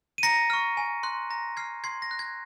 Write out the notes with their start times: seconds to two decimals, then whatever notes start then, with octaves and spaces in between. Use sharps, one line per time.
0.18 D#7
0.23 A#5 A#6 C#7
0.50 C#6 F6
0.77 G#5
1.03 C6 F#6
1.30 A#5 A#6
1.57 F6 G#6 C7
1.84 C6 G#6 C7
2.02 A#6
2.11 F#6
2.19 G#6